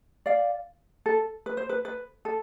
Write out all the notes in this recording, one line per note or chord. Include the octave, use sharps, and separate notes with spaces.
D5 F5
A4
B4
C5
B4
B4
A4